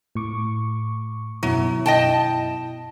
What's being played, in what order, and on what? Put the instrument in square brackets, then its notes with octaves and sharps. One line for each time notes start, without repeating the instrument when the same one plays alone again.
[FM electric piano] A2 C#6 D6
[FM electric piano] F#2 B2 E4 [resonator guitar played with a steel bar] F#3
[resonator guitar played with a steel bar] D#5 G5 A5